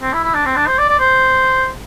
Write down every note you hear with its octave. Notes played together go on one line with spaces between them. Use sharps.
C4
E4
E4
D4
C4
D4
C5
D5
D5
C5